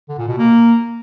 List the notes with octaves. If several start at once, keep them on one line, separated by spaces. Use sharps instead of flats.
D3
A#2
B2
A#3